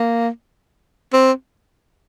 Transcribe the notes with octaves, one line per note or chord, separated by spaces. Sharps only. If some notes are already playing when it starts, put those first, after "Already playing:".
Already playing: A#3
C4